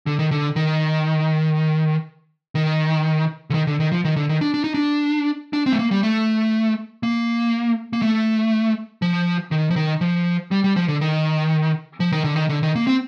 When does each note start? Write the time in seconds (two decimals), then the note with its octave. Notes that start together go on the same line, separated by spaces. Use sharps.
0.06 D3
0.19 D#3
0.31 D3
0.56 D#3
2.55 D#3
3.50 D3
3.54 D#3
3.67 D3
3.80 D#3
3.92 F3
4.05 D#3
4.16 D3
4.29 D#3
4.41 D4
4.54 D4
4.64 D#4
4.74 D4
5.53 D4
5.66 C4
5.72 A3
5.79 A#3
5.91 G3
6.03 A3
7.03 A#3
7.93 A#3
8.02 A3
9.02 F3
9.51 D#3
9.70 F3
9.76 D#3
10.01 F3
10.51 G3
10.64 G3
10.76 F3
10.88 D3
11.01 D#3
12.00 F3
12.12 D#3
12.24 D3
12.36 D#3
12.49 D3
12.63 D#3
12.76 A#3
12.87 C4